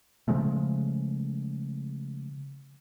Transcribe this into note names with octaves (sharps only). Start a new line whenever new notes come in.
C#3 F3 G#3 A3